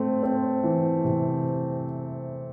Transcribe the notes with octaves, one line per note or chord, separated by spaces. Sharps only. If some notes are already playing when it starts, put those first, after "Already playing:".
Already playing: A3 C4
C4
E3
C3